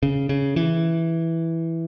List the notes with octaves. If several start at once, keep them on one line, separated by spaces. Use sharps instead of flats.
C#3
C#3
E3